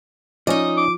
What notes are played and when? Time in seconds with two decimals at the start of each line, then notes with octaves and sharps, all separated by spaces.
0.47 F3 C#4 D#4 D5 D#5
0.78 D6